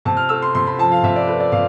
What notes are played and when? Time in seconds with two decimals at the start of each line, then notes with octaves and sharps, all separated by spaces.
0.05 C3 A5
0.17 F6
0.29 A3 E6
0.42 C6
0.55 C3 C6
0.67 B5
0.78 F3 A5
0.92 F5
1.03 C3 E5
1.16 D5
1.27 A3 B4
1.40 D5
1.52 C3 F5